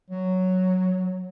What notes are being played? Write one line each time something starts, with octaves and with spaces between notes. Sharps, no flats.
F#3